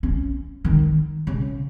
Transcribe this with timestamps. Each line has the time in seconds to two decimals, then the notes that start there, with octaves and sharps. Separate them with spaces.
0.03 C#4
0.65 D#3
1.27 C#3